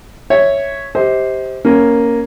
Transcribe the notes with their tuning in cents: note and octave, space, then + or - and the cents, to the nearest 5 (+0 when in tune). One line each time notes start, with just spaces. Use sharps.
C#5 +0 E5 +0
G4 +0 C5 +0 D#5 +45
A#3 +0 C#4 +0